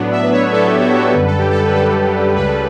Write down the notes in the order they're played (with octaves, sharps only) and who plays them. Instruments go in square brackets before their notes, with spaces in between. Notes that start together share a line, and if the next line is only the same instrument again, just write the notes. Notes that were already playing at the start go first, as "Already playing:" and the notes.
Already playing: [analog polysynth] A2 F#3 B3 D4
E5
B4
C#5
A2 F#3 B3 D4 A4
G4
F#4
G4
F#2 D3 G3 B4
A4
G4
A4
B4
F#2 D3 G3 A4
C#2 C#3 G3 B4
A4